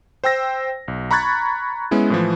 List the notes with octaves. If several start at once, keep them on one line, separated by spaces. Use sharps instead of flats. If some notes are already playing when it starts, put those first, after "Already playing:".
C5 G5 E6 A#6
B1
A#5 B5 C#6 F#6 G#6 A6
G#3 B3 C#4 E4
A2 E3 F3